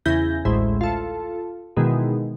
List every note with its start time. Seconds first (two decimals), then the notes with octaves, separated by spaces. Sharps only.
0.06 E2 C#3 E4 G#5 G6 A#6
0.45 A1 D2 A2 G#3 E4 C5
0.81 F4 A4
1.77 B2 D#3 E3 G#3 B3